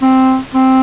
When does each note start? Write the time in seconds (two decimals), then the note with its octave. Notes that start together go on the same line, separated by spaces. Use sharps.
0.02 C4
0.54 C4